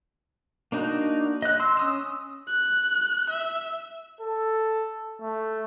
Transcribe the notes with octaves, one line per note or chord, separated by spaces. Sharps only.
A#3 D4 D#4 F#4
D#5 F#6
C6 E6
C#4 D#6 E6
F#6
E5
A4
A3